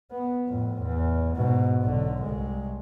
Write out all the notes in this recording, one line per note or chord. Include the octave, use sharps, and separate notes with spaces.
B3
F2 A2
E2
G#2 B2
B1 D3
C2 G#3